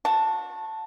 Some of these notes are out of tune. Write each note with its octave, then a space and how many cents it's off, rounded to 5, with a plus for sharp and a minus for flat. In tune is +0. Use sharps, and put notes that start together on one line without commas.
F#4 -30 A5 +0